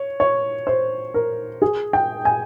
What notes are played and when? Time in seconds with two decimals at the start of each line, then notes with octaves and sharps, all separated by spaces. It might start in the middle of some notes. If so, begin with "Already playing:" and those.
Already playing: C#5
0.20 C#5
0.67 C5
1.14 A#4
1.62 G#4
1.93 G5
2.25 G#5